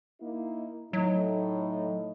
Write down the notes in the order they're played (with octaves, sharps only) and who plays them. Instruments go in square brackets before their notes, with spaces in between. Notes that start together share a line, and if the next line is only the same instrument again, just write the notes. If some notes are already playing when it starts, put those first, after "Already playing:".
[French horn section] A#3 D#4 E4
[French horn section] A2 D#4 [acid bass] F#3